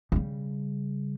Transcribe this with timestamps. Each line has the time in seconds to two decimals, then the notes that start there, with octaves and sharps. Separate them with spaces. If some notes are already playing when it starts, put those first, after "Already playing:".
0.12 C#3 G3